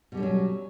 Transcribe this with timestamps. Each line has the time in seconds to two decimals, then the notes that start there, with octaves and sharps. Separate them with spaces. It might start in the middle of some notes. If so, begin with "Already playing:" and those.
0.12 B2
0.15 G3
0.17 D3
0.20 C#4
0.23 F#3